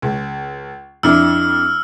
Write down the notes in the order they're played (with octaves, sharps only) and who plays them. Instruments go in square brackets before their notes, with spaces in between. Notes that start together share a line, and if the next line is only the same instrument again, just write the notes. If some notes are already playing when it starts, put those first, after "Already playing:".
[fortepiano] C#2
[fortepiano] F2 D4 E4 [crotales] E6 F6